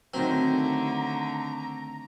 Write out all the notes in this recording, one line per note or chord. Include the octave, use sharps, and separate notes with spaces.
D3 D#3 F#3 A3 C4 A#5